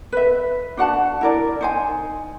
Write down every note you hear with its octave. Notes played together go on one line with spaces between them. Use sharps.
B4 E5
D4 F#4 F#5 A5
E4 A#4 D5
D#4 C5 G#5